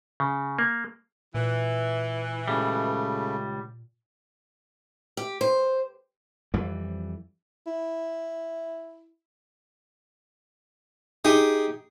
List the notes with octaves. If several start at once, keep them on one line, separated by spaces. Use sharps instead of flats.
C#3
A#3
A#2 E3
C#2 C#3 G3 A3
G4
C5
F2 E3 G3
E4
D#4 G4 G#4